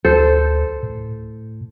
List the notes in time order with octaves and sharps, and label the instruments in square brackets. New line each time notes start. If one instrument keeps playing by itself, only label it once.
[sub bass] D2 [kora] A4 C5
[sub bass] A2